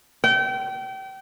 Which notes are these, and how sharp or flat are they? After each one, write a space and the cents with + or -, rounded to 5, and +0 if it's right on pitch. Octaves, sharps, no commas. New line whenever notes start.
G5 -30